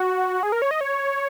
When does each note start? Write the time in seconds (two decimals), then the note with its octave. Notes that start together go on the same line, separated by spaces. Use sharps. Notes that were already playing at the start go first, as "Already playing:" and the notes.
Already playing: F#4
0.43 G#4
0.52 A#4
0.62 C#5
0.71 D#5
0.81 C#5